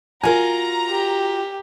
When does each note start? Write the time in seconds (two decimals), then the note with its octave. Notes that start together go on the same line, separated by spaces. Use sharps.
0.23 F4 F#4 A#4 G#5 A#5
0.89 G4